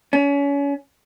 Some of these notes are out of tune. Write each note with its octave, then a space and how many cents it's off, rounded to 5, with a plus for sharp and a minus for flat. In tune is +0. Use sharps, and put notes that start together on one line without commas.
C#4 +35